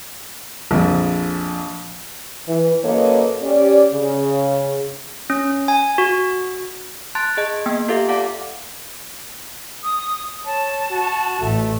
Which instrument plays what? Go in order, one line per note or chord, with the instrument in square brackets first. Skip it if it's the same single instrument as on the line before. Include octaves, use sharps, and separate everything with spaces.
[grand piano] A#1 F2
[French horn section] E3
F#2 A#3 A4 B4 C#5 D#5
C#4 G4 D5
C#3
[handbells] C#4
G#5
F#4
A5 C6 F#6 A6
G#4 D#5 A5
A#3 B3 G5
F4 G4 A4 E5 F5
D5 F5 F#5 A5 D6
[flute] D#6
[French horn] C#5 [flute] A5
[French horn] F#4
[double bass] A1 [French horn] A3